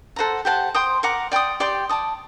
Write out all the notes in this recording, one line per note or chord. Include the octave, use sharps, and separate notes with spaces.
A4 C5 F#5 A#5
G4 C5 F#5 A5
C5 G5 C6 D#6
A#4 F#5 A#5 D6
D5 G5 C6 D#6
G4 D5 G5 C6
D5 A5 D#6